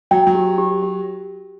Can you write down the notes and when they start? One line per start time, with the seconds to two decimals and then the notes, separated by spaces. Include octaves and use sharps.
0.11 F#3 G5
0.27 F#3
0.35 G4
0.58 G4
0.82 G4